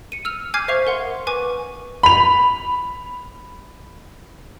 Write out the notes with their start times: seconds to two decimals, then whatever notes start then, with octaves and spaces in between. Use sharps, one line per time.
0.12 C#7 D#7
0.25 E6 F6 F7
0.54 G#5 D6 F6 G6 G#6 C7
0.68 C5 E5 F5 C#6 C7 F7
0.87 A#4 F#5 C6
1.27 B4 G#5 C#6 D6
2.03 B5 F7